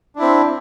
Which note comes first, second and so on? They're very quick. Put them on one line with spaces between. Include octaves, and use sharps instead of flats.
D4 E4 C4